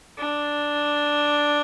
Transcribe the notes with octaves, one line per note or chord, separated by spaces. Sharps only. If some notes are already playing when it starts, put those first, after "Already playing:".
D4